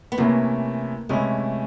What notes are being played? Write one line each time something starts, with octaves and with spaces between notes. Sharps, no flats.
B3
C3 E3 A3 A#3 C#4 E4
C3 E3 G#3 A3 C#4 E4